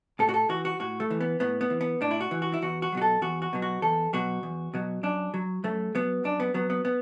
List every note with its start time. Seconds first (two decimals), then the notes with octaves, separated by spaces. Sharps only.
0.19 A2 A4
0.29 F#4
0.34 A4
0.49 E3 F#4
0.65 F#4
0.80 A2 F#4
1.00 A3
1.10 E3
1.21 B3
1.40 A2 B3
1.61 B3
1.70 E3
1.81 B3
2.01 A2 D4
2.11 E4
2.21 F#4
2.31 E3
2.42 F#4
2.54 E4
2.62 E2 F#4
2.82 F#4
2.92 B2 F#3 F#4
3.02 A4
3.22 E2 F#4
3.42 F#4
3.53 B2 F#3
3.62 F#4
3.82 E2 A4
4.13 B2 F#3 F#4
4.43 E2
4.74 B2 F#3
5.03 F#2 D4
5.34 F#3
5.64 F#2 A3
5.95 F#3 B3
6.24 F#2 D4
6.40 B3
6.54 F#3 B3
6.70 B3
6.85 B3